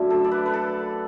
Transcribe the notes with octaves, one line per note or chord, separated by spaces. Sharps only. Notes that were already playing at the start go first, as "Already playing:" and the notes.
Already playing: F#2 D3 A3 E4
A4
D5
B4
B4
A4